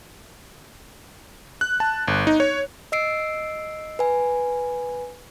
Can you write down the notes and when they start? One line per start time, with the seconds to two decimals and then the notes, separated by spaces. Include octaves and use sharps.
1.61 F#6
1.80 A5
2.08 G1
2.27 D#4
2.40 C#5
2.92 D#5 E6 C7 D7
3.99 B4 G#5